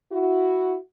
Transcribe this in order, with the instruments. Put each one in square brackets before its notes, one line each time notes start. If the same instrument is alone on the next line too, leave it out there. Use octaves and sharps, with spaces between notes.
[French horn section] E4 F#4